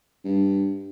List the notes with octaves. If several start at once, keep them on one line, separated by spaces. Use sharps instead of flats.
G2